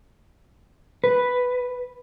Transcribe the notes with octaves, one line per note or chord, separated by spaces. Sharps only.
B4